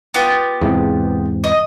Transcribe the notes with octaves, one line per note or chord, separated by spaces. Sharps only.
B3 F4 G4
E2 G#2 C3
D#5